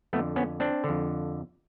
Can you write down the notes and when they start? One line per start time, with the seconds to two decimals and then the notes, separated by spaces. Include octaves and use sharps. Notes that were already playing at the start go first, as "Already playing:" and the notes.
0.13 F2 A3 B3
0.17 D3
0.36 B3 C#4
0.60 C4 D4
0.84 D3
0.89 F2